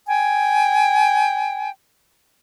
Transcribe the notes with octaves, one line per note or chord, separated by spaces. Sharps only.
G5 G#5